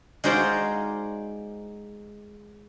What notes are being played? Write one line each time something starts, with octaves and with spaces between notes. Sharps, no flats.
G#3 D#4 F#4 C5 D5 F5